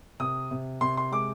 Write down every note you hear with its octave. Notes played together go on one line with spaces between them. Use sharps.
C3 D#6
C3
C3 C6
C6
G#3 D6